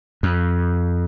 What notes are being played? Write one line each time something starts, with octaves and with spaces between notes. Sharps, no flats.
F2